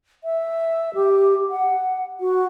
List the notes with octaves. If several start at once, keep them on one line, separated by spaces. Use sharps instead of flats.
E5
G4
F#5
F#4